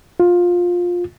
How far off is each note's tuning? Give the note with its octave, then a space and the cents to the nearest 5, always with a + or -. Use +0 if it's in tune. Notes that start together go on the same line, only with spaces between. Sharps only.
F4 +15